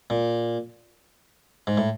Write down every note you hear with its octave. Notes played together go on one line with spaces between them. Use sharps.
A#2
G#2
A2